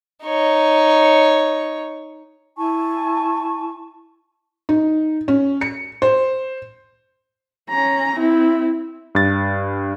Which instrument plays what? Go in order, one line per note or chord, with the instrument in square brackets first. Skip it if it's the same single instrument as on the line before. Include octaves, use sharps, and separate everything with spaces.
[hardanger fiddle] D#4 C#5
[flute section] E4 G#5 A5 C#6
[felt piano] D#4
C#4
C#7
C5
[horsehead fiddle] C#4 A#5
C4 E4
[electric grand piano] G2 A6